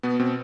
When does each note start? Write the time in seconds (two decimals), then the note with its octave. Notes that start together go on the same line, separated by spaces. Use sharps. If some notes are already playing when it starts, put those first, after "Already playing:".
0.03 B2 B3
0.19 B2 C4